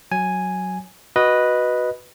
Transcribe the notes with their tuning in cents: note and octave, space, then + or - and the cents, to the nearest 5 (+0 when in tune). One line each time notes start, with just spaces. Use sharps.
F#3 +0 G#5 +0
F#4 +0 B4 -5 D#5 +0